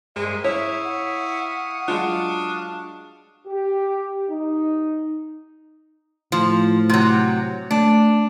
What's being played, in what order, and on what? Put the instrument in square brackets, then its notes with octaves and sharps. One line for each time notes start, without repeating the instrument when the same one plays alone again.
[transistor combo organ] G2 A#4 C5 [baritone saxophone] G#3 [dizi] E5
[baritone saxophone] E4 [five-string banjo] C#5 [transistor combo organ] F5 C#6 D#6
[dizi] F#5
[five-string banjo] F#3 G#3 F4 [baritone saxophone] D4
[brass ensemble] G4
D#4
[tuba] A2 [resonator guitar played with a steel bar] F3
[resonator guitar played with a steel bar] C3 F#3
[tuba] A3 [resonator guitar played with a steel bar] D4